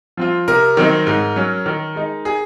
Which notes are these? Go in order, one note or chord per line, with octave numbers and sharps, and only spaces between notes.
F3 C4 F4
C3 A#4
D#3 F#3 C4 D#4
G#2
F#3 C#4
D#3
G#3 D#4
G#4